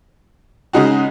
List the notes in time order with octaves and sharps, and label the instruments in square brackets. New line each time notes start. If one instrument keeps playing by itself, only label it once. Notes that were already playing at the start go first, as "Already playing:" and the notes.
[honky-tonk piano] C#3 G#3 D#4 F#4